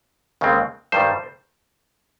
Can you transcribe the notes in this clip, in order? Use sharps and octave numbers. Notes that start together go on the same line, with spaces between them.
D#2 C#3 G#3 C4
G2 D#3 G3 C5